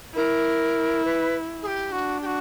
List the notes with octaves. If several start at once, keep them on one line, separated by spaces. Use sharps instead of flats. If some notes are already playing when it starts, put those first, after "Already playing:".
E4 A#4
B4
G#4
G4
D4 F#4
G4
F#4